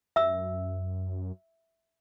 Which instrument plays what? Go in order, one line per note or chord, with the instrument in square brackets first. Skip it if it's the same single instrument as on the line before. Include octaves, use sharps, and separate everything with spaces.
[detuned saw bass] F#2 [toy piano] E5 E6